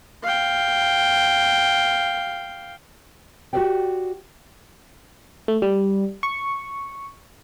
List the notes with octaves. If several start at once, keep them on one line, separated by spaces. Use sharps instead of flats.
F5 G5
F#4 G4 A4 B4 D5 G5
A3
G3
C#6